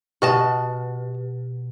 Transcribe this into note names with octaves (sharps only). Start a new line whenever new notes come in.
B2 F#4 G4 B4 D#5 A5